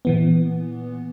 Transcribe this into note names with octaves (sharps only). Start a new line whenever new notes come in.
A#2 E3 B3